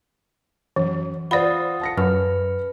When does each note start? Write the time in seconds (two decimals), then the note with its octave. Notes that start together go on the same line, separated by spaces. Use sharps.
0.76 F#2 E3
1.31 F4 C5 D5 F#5 B5 D#6 A6
1.81 A5 A#6 C#7
1.97 F#2 B4 F6